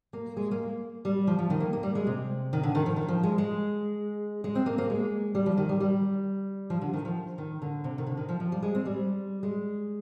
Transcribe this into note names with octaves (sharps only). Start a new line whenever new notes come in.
A#3
G#3
A#3
G3
F3
F3
D#3
A#3
A#3
G3
G#3
C3
D#3
D3
D#3
F3
D#3
F3
G#3
G#3
G#3
C4
A#3
A#3
G#3
G3
F3
D#3
G3
G3
F3
D3
D#3
F3
D#3
D3
C3
D#3
D3
D#3
F3
F3
G3
G#3
C4
G3
G#3